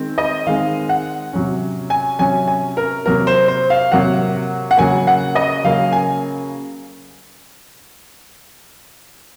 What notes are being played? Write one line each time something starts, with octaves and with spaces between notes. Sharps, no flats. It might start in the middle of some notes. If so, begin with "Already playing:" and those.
Already playing: D#3 G#3 C4
D#5
D#3 G#3 C4 F5
F#5
C3 F#3 C#4
G#5
C3 F#3 C#4 G#5
G#5
A#4
C3 F#3 A#3 A#4
C5
C5
F5
C3 F#3 A#3 F#5
F#5
C#3 F#3 A#3 G#5
F#5
D#5
C#3 F#3 A#3 F5
G#5